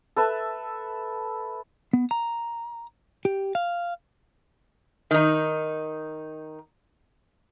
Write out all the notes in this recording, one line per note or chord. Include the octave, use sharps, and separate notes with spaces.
A4 B4 E5 A5
B3
A#5
G4
F5
D#3 D#4